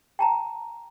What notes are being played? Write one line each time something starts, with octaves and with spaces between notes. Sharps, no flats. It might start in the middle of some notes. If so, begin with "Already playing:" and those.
G5 A5 A#5